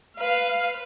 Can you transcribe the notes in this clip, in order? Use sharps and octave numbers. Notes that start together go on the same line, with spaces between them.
B4 F5